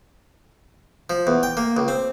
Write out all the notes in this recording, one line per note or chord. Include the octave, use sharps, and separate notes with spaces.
F3
E2
G5
A#3
C#2
C4